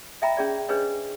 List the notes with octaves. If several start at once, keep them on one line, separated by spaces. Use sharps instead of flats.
D#5 E5 G5 A#5 B5
C#4 G#4 D5
D4 G#4 B4 C#5 D#5